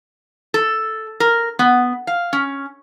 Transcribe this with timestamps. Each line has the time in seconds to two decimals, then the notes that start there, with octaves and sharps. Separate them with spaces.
0.54 A4
1.20 A#4
1.59 B3
2.07 F5
2.33 C#4